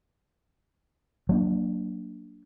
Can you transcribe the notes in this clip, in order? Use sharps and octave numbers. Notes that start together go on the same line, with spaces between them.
F#3 A#3 D4